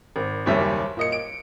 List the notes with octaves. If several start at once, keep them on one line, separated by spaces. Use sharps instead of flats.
G#1
F#1 D#2 G3 C#4 E5
A#2 D#5 C#7
D7